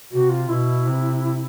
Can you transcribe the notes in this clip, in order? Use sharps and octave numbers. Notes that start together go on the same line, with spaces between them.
C3 F#4
F4
B2 E4
C3